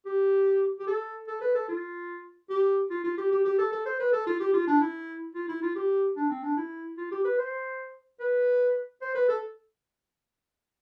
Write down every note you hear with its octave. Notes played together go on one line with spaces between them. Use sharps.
G4
G4
A4
A4
B4
A4
F4
G4
F4
F4
G4
G4
G4
A4
A4
C5
B4
A4
F4
G4
F4
D4
E4
F4
E4
F4
G4
D4
C4
D4
E4
F4
G4
B4
C5
B4
C5
B4
A4